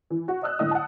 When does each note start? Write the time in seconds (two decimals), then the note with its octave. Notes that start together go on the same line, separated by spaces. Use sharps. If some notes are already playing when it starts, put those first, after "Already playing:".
0.10 E3
0.28 F#4
0.42 D5 D#5 D#6 E6 F#6
0.59 A2 D3 D#5 D#6
0.71 F#5 A5